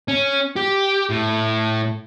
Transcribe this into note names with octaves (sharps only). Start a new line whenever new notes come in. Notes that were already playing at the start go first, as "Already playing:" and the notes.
C#4
G4
A2